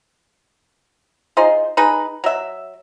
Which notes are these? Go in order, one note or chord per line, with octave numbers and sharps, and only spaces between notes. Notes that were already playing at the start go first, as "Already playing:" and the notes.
D#4 F4 G#4 C5
D#4 G#4 B4
F#3 E5